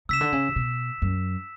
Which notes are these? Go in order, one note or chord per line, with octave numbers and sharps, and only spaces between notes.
C#3 E6 B6 E7
D3
C#3
B2
F#2